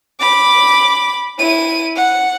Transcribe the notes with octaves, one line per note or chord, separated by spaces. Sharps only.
B5 D6
E4 D#7
F#5